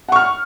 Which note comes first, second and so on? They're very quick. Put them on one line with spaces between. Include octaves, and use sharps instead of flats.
F#5 C#6 F6